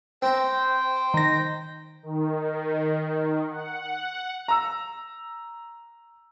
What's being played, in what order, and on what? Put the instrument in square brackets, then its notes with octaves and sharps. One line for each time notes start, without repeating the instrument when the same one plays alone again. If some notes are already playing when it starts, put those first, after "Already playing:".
[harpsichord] C4 A#5 [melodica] C5 G5
[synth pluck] D#3 A#6
[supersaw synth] D#3
F#5
[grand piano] A#5 E6